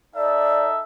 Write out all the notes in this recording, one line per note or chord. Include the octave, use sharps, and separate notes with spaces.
D#4 A4 D5 E5